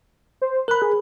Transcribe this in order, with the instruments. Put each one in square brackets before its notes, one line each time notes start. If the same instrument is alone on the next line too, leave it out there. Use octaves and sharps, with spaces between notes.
[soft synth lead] C5
[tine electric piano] A#4 B5 [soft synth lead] F#6
[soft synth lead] G#4